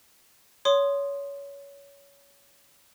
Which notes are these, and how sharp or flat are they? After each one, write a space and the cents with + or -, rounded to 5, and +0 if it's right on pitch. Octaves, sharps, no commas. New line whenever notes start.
C#5 +20 C6 +0 D#6 -10